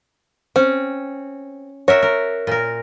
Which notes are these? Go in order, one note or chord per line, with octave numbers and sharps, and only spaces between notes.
C4 C#4
F#4 A#4 C#5 E5
A#4
A#2 A#4